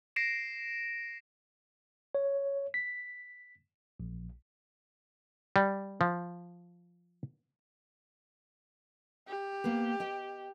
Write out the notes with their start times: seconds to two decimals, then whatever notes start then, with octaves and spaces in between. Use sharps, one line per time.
0.16 A#6 C7 D7 E7
2.15 C#5
2.74 B6
4.00 A#1
5.56 G3
6.01 F3
9.27 G4
9.64 A#3 B3 B4
10.00 D#5 G5